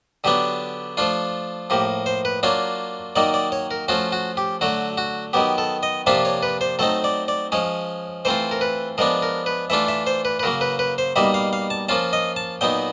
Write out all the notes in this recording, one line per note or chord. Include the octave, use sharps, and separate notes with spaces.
D3 F#3 B3 D4 G4
F3 A3 D4 F4
A2 F3 A#3 G4
C5
B4
F#3 A#3 D4 F4 C#5
D#3 F#3 A#3 D#4 D5
D5
C#5
A#4
F3 A3 C#4 F4 F#4
F#4
G4
D3 F#3 A3 F#4
F#4
D#3 F#3 B3 G4
A4
D#5
C3 F3 A#3 D4 F4 E5
C#5
B4
C5
F#3 A3 C4 D#4 A4
D5
D5
F3 G#3 C#4 C#5
E3 A3 C4 F4 C5
A#4
B4
F3 G#3 B3 D4 A#4
A#4
B4
E3 A3 D4 F4 E5
E5
C5
B4
B4
C#3 F#3 A#3 A#4
B4
B4
C5
B2 G3 A#3 D#4 E5
F5
F5
A5
F3 A#3 C#4 F4 A5
D#5
A5
A#2 F#3 B3 D#4 G5